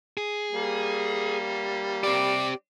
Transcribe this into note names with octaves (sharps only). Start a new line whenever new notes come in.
G#4
G3 A#3
C4 G4 D5